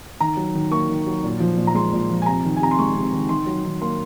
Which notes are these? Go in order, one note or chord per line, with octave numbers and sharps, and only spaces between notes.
D#3 A#5
F#3
D#3
A#3 C#6
D#3
F#3
A#2
F3
A#2
A#5
G#3 C6
A#2
F3
G#5
C3 A#5
D#3
G#5
C3 A#5
C6
G#3 C#6
C3
D#3
D#3 C6
F#3
D#3
A#3 C6